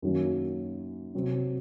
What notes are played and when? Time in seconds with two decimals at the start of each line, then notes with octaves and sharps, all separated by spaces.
0.02 F#2 D#3 F#3 A#3 C#4
1.15 C3 F#3 C4